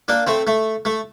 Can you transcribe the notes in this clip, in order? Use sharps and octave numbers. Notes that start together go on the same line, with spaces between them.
A#3 D4
A3 C4
A3
A3